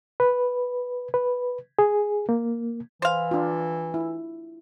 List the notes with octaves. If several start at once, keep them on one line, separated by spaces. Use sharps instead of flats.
B4
B4
G#4
A#3
E3 C5 F5
D4 F4
E4